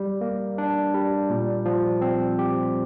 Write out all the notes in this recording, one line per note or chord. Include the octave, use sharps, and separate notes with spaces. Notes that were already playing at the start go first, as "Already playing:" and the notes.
Already playing: G3
A#3
D4
G3
A#2
F3
C4
G4